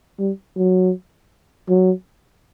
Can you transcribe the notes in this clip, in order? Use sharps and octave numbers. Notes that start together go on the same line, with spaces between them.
G3
F#3
F#3